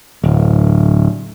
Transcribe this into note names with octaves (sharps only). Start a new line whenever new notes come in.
D1